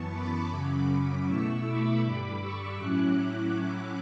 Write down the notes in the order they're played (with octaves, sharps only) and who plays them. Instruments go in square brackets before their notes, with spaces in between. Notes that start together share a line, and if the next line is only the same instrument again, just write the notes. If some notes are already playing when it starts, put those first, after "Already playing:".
Already playing: [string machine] F#2 E3 B3 A5 C#6
B5 D6
F#2 C#3 F#3 C#4
B2 A3 E4 C#6 E6
B5 D6
G2 D3 G3
C#6 E6
A2 F#3 C#4 E4 D6 F#6